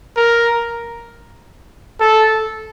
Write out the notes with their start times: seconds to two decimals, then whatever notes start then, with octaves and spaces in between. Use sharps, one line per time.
0.17 A#4
2.00 A4